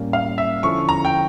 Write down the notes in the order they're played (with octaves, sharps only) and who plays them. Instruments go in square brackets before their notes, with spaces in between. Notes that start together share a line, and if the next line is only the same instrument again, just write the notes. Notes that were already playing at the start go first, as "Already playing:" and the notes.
Already playing: [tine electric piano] A2 G3 A#3 C#4
[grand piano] F5
E5
[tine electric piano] D3 F3 C#4 E4 A4 [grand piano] C#6
[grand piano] A#5
G5